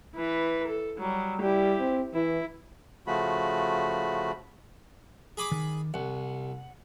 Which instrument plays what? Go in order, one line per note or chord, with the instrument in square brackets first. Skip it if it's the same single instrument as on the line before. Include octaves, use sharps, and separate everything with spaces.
[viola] E3 B4
A4
F#3 G3
[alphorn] G3 [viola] E4 G4
[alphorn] C4
[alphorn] E3 [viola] E4
[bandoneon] C#3 F3 A3 F#4 B5
[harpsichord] G#4 B5 D6
[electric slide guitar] D#3
[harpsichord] C2 [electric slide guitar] F#5